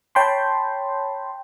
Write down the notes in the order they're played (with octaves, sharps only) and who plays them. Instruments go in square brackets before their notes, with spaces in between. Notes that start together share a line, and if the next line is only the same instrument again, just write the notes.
[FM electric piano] C#5 G5 A5 B5 C6